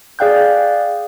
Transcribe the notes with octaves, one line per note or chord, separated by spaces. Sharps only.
G#4 D5 F5 G5 F#6 G6